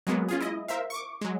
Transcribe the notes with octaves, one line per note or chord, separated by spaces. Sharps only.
F#3 G#3 A#3 B3
C#4 F4 G#4
E4 D#5
A#4 C5 E5 F5
C#6 D6
F#3 G#3